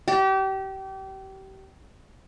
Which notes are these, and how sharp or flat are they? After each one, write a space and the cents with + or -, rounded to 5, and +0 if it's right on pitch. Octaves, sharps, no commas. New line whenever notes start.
G4 -30